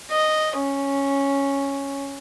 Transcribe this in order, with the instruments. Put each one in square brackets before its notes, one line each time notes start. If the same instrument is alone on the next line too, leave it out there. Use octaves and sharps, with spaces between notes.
[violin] D#5
C#4